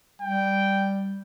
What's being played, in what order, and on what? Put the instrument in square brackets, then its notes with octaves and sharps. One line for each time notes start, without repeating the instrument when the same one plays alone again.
[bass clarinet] G3 [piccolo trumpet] G5